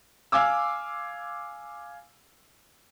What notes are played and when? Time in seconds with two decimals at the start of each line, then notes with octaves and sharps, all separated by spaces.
0.32 F5 G#5 D6 E6